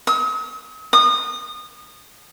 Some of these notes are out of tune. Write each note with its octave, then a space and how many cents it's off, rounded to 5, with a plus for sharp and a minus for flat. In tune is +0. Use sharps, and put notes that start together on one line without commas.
D#6 +45
D#6 -25